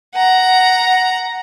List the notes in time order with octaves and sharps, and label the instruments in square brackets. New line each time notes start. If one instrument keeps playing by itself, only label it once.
[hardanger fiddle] F#5 A#5